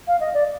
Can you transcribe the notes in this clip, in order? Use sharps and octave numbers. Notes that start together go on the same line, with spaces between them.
F5
D#5
D5